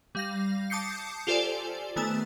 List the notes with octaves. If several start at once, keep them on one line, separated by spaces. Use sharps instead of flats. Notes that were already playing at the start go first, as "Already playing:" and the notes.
G3 F5 A#6
A5 D6 D#6 G6 C7 C#7
F4 G4 A4 C5 D5 G#5
D#3 A3 B3 G#5 A5 E7